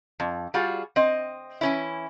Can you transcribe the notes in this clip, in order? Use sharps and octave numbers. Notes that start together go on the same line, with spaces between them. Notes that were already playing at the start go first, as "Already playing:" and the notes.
F2
G3 F4 F#4 G#4
C4 D#5
E3 C#4 E4